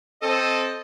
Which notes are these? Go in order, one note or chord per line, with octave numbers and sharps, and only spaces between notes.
C4 A4 D#5